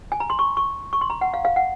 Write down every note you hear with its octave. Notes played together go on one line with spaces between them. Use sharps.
G#5
A#5
C6
C#6
C#6
C#6
C6
A#5
F#5
F5
F5
F#5